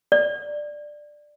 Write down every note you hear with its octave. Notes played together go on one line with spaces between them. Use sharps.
D5